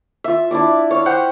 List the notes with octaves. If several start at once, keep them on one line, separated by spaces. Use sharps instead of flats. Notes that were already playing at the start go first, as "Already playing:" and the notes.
F4 E5
D4 E4 D5 D6
C#5 F5
C5 F#5 G5 B5